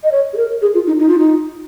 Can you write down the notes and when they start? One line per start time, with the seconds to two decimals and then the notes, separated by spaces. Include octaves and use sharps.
0.04 D#5
0.12 C#5
0.33 G#4
0.37 A#4
0.62 G#4
0.74 F4
0.87 D#4
0.99 D#4
1.09 F4
1.18 D#4